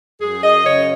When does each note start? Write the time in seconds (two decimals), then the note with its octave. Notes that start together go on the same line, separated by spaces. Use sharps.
0.20 F#2 G#4
0.43 D#5
0.64 C#3 C#5